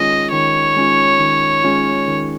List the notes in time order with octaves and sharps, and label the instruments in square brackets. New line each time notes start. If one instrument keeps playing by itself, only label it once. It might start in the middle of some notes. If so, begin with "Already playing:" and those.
Already playing: [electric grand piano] D#3 G#3 C#4 F4 [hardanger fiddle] D#5
[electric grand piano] D#3 [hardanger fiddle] C#5
[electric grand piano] G#3 C#4 F4
D#3
G#3 C#4 F4
D#3